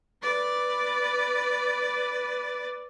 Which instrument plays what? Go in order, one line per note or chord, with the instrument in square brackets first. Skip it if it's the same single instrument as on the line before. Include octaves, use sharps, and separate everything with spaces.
[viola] B4 D5